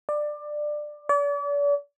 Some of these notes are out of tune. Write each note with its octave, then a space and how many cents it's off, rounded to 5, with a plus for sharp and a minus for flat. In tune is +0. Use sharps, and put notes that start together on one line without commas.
D5 +15
D5 -40